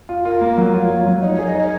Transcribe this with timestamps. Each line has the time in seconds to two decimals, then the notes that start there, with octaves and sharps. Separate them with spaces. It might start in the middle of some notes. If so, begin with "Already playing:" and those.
0.09 F4
0.25 F4 A#4
0.41 A#3
0.58 F#3
0.73 F4 C#5
0.90 F4
1.06 F#3
1.22 D#4 C#5
1.34 C#5
1.39 G#4
1.47 D#5
1.55 D#4 C#5